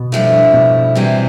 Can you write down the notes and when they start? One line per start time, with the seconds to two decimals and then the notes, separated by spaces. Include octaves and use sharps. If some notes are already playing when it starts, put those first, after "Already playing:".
Already playing: B2
0.12 G2 F3 A3 E4
0.54 B2
0.95 C3 E3 G3 C4